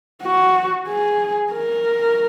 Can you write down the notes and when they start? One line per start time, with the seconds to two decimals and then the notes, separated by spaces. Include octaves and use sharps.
0.23 F#4
0.88 G#4
1.52 A#4